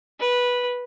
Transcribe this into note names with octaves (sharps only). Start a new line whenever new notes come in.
B4